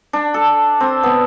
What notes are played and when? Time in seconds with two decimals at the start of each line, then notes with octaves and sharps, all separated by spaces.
0.13 D4
0.34 A4
0.80 C4
1.03 B3